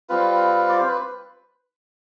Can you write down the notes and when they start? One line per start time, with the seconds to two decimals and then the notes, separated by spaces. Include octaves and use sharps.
0.09 G3 C4 F4 B4
0.68 D5
0.78 C5
0.88 B4